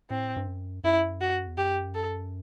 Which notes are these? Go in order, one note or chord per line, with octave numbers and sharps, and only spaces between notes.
A2 C4
G2
F#2
F#2 E4
F#4
E2
F#2 G4
A4